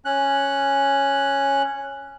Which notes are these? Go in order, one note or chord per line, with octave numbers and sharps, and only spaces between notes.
C#4 F#6